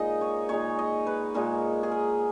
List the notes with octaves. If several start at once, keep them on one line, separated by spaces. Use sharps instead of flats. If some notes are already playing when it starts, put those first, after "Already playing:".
Already playing: A#2 G#3 D#4 D#5
C#5
A#2 G#3 D#4 C#5
D#5
B4
A#2 G#3 D#4 A#4
G#4
A#4